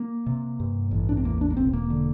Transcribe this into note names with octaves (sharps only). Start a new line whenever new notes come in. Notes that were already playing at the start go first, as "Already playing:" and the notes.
Already playing: A#3
C3
G2
A1
D4
C4
E2 A#3
D4
A#3
E1 C4
A#3
D3